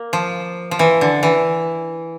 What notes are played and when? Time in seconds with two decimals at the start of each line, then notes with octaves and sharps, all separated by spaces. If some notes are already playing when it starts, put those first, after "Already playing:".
Already playing: A#3
0.13 F3
0.71 F3
0.79 E3
1.01 D3
1.23 E3